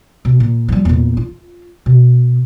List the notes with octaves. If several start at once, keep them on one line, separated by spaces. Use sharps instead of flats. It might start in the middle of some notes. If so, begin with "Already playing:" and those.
B2
A#2
F3 G3
E2 A#2
F4
B2